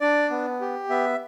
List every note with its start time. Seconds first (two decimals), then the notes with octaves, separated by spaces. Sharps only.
0.01 D4 D5
0.30 B3
0.61 G4
0.89 B3 E5